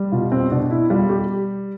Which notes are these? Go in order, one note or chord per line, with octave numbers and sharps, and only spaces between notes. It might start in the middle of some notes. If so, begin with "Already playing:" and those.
Already playing: G3
B2 F4
C4
B2 D4
E4
G3 F4
G4